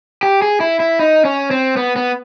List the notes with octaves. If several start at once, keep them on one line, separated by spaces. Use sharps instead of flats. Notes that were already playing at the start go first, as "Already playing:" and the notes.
G4
G#4
E4
E4
D#4
C#4
C4
B3
B3